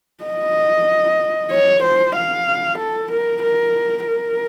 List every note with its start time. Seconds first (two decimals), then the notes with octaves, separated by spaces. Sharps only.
0.24 D#5
1.51 C#5
1.83 C5
2.15 F5
2.79 A4
3.11 A#4
3.43 A#4
4.08 A#4